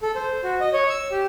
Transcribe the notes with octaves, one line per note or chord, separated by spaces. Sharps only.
A4
C5
F#4
D#5
C#5
E6
G4